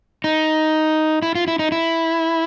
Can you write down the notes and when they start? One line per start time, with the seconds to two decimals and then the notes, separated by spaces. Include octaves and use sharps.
0.24 D#4
1.22 E4
1.35 F4
1.48 E4
1.59 D#4
1.72 E4